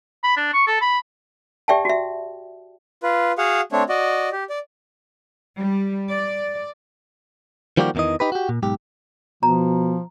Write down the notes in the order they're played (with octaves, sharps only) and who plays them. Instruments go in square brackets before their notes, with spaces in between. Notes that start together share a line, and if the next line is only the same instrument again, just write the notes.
[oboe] B5
D4
C#6
A4
B5
[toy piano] G4 D5 E5 G5 A5
F#4 E5
[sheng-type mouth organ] F4 B4
F#4 G#4 F5 F#5
A3 C4 D4 C#5
F#4 D5 D#5
G4
D5
[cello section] G3
D5
[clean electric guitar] D#3 F3 G3 A#3 F#4 G4
E2 A2 D#3 E3 D#5
D#4 G4 B4
F#4 G4
A#2
B1 G#2 G4
[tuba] B2 [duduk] F3 [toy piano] A#5